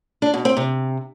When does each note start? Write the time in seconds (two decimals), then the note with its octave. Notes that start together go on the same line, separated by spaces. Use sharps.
0.22 D4
0.34 B2
0.45 C4
0.57 C3